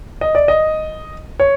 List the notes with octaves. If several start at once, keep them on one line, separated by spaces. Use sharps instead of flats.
D#5
D5
D#5
C#5